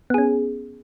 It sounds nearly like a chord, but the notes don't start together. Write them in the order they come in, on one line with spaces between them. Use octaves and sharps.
B3 G#4 C#4